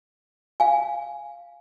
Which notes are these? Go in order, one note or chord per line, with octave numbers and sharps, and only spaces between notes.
F5 G#5